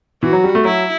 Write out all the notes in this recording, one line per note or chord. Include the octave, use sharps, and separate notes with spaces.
E3 F#4
F#3
G3
A3
F#3 E4